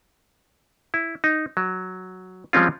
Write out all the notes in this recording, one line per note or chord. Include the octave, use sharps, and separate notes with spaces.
E4
D#4
F#3
F3 G3 G#3 C4 C#4 F4